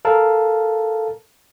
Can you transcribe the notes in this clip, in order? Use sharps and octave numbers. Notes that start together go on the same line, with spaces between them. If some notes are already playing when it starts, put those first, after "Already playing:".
A4 A#4 F5 A5